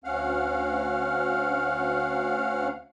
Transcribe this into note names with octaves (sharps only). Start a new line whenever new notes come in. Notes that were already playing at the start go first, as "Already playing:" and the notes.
D2 C#4 F5 F#5 F6